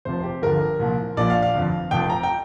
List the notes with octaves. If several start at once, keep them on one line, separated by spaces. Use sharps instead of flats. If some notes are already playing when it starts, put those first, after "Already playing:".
F1 F2 C3 F3 C5
G4
G1 G2 D3 F3 A#4
C2 A#2 F3
A#1 A#2 F3 D5
F5
F5
G1 F2 F3
F1 F2 F3 G5
A#5
G5